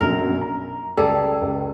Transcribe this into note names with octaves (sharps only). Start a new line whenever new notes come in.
A#1 F#2 B2 A#4
A#5
C#2 G3 G#4 A4
C#2